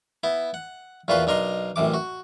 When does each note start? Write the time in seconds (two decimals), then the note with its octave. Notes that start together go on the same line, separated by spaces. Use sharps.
0.23 B3 E4
0.54 F#5
1.08 E2 A#2 F4 F#4 B4 C6
1.27 B1 D4 A#4 D#5 C6
1.76 A1 F#2 C3 D6
1.94 F#4